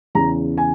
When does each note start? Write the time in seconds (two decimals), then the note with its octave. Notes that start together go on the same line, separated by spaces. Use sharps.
0.15 E2 C#3 E3 A#5
0.58 G#5